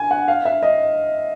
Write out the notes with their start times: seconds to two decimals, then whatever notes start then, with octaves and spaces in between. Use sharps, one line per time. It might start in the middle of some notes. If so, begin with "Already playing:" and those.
Already playing: G#5
0.11 F#5
0.28 F5
0.45 E5
0.63 D#5